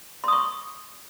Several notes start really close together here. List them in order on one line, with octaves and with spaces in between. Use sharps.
C6 D#6 C#6